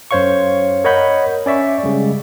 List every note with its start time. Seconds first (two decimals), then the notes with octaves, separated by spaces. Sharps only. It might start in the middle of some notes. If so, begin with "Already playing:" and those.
0.11 F#2 C5 C#5 F5 C#6
0.84 A#4 C#5 D#5 F#5 B5 G6
1.46 C#4 D5 E5 C#6
1.83 C#3 G3 G#3